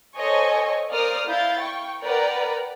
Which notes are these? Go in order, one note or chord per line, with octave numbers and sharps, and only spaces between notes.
A4 C5 C#5 D#5 G#5 C#6
A#4 C5 D5 F5 D#6 F6
E4 F5 G6 A6
G5 C#6
A#4 B4 D5 F#5 G5 A#5